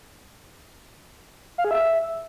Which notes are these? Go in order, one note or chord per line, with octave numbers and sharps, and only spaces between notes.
F5
G#4
E5